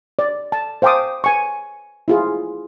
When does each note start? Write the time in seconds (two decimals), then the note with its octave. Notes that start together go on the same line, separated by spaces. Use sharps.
0.19 D5
0.52 A5
0.82 C5 F5 G5 A5 D6 D#6
1.24 B4 G#5 C#6
2.08 E4 F4 G#4